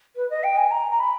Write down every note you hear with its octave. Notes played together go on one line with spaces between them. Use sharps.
B4
D#5
G5
G#5
A#5
A#5
B5